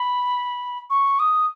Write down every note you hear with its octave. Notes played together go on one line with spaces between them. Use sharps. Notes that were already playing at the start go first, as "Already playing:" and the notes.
Already playing: B5
C#6
D#6